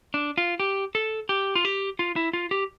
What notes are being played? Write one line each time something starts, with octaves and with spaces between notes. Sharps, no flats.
D4
F4
G4
A4
G4
F4
G4
F4
E4
F4
G4